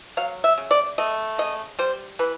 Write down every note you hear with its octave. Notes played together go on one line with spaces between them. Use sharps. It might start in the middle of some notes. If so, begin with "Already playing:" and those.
F#3 F5
E5
C#3
D5
A3 D#5
C#3 D#5
G3 C5
E3 B4